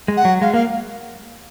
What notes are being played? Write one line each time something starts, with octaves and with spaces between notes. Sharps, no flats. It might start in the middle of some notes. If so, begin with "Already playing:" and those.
G#3
F#5
F#3
G#3 F5
A#3 F5